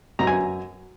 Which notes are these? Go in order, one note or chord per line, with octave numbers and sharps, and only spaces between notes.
F#2 A#5
G#5